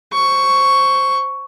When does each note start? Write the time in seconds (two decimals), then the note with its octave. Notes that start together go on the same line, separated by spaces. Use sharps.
0.13 C5 C#6